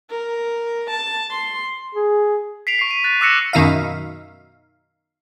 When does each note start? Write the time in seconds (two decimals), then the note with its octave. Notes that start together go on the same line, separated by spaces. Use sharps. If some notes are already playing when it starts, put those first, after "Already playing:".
0.10 A#4
0.91 A5
1.31 C6
1.95 G#4
2.67 B6 C7 D7 F7
2.79 C#6 C7
2.91 D#7
3.04 F#6 A6
3.21 D6 E6 F#6 A#6 C#7 E7
3.53 F#2 B2 D#3 D#4 E5 F5